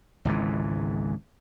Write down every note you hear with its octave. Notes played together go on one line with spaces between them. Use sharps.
G#1 C#2 G#2 E3